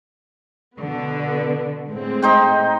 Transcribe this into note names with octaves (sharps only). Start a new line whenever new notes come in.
B2 D3 B3
A2 G#3 C4
D#4 C5 G5